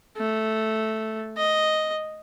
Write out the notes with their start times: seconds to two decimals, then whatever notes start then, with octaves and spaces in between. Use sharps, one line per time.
0.17 A3
1.37 D#5